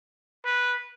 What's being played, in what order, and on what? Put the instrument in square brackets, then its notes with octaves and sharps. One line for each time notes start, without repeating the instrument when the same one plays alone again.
[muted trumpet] B4